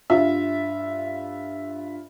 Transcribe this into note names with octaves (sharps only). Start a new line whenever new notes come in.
G2 F4 E5